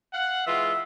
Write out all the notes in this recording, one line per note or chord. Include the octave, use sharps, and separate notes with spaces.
F5 F#5
E3 G#3 F4 E5